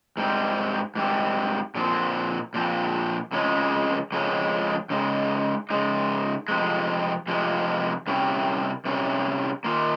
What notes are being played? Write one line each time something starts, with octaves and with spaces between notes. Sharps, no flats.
G#2 G3 C4
G#2 G3 C4
A#2 F3 C4
A#2 F3 C4
F2 C#3 F3 G#3 C#4
F2 C#3 F3 G#3 C#4
C#3 G#3 D#4
C#3 G#3 D#4
F2 C3 F3 G#3
F2 C3 F3 G#3
C3 G3 C#4
C3 G3 C#4
D#3 A#3 F4